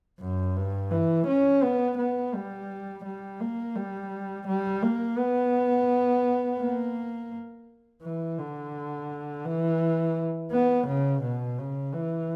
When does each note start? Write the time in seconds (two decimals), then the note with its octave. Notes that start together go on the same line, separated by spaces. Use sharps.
0.20 F#2
0.57 G2
0.91 E3
1.27 C#4
1.63 B3
1.98 B3
2.34 G3
3.05 G3
3.41 A#3
3.76 G3
4.48 G3
4.83 A#3
5.18 B3
6.60 A#3
8.03 E3
8.38 D3
9.45 E3
10.52 B3
10.88 C#3
11.23 B2
11.59 C#3
11.94 E3